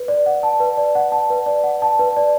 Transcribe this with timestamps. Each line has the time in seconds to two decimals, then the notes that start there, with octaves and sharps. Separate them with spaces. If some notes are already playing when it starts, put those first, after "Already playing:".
Already playing: B4
0.08 D5
0.26 F#5
0.43 A5
0.60 B4
0.77 D5
0.95 F#5
1.12 A5
1.30 B4
1.46 D5
1.64 F#5
1.82 A5
1.99 B4
2.16 D5